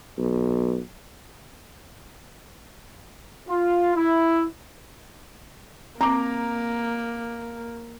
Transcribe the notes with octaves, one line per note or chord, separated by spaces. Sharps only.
B1
F4
E4
A#3 C4 A#5 D6